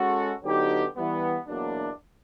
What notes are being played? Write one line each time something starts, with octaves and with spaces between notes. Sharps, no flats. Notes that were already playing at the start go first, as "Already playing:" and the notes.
Already playing: G#3 C#4 F#4 A4
D3 F#3 B3 D#4 G4
E3 G3 B3
E2 B2 F#3 A#3 D4